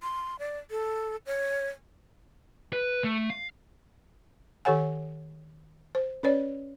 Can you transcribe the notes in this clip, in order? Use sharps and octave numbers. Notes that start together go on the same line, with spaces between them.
C6
D5
A4
C#5
B4
A3
F5
D#3 G4 A4 C#5 F#5 G#5
C5
C#4 B4 C#5 D5